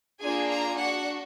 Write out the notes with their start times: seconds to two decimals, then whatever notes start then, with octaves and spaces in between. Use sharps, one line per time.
0.20 A#3 D4 F4 G#4 G#5
0.49 A#5
0.78 D4 F#4 F#5